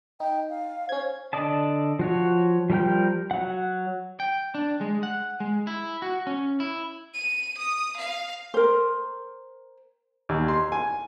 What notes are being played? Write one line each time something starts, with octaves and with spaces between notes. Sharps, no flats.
D#4 G5
F5
C#4 C5 G#6
D3 D5 D#5 A5
F3 F#4 C#5
F3 G3 A#4 G5 G6
F#3 F#5
G5
D4
G#3
F#5
G#3
E4
F#4
C#4
E4
D#7
D#6
F5
A#4 C5
D#2
C6
G#5